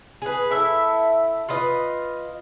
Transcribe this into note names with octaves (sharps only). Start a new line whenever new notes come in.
G#4 B4
E4 A4 E5
F4 B4 D#5